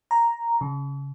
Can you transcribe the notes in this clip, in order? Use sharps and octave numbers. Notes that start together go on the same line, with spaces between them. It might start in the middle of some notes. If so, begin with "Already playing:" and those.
A#5
C#3